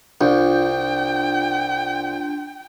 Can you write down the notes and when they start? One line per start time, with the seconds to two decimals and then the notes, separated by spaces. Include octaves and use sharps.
0.21 C2 D4 F4 G5 G6